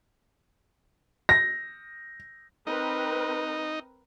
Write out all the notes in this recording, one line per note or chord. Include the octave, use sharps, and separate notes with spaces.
A#6
C4 D#4 A#4 B4